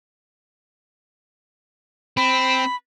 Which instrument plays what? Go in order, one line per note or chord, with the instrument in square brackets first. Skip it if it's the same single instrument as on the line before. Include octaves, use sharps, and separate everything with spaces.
[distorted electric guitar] C4 [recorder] B5